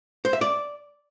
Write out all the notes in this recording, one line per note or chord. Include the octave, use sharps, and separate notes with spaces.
C5
E5
D5